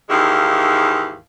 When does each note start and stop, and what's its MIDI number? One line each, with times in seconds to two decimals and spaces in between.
0.10 1.18 39
0.10 1.18 44
0.10 1.18 52
0.10 1.18 56
0.10 1.18 77